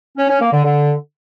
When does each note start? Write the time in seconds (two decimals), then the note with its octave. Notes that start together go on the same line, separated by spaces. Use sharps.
0.17 C#4
0.29 C#4
0.40 A#3
0.52 D3
0.64 D3